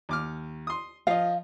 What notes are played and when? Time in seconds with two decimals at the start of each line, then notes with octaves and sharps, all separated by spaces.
0.09 D#2 D6 F6
0.67 C6 D#6
1.07 F3 D#5 F5